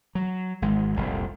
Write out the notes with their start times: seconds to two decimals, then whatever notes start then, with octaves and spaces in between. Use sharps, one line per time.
0.15 F#3
0.62 G#1 G#3
0.96 F1 C2 A#2